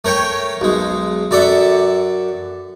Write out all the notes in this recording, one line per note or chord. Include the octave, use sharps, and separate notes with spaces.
A3 A#4 C#5 G5
B1 G#3
F#2 A4 D5 E5 F#5